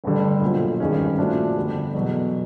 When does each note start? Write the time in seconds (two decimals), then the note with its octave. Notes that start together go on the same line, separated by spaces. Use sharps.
0.04 A1 G2 D3 G3
0.41 B1 A#2 F3
0.80 G#1 G2 D#3 G#3 C#4
1.18 A#2 F3 A3 D4 F#4
1.57 G1 F2 D3 G3
1.94 E2 B2 F#3